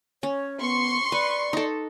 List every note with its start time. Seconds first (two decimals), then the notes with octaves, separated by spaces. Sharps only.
0.23 C#4 C#5
0.61 B3 C6 C#6
1.12 B4 D5
1.53 D#4 A4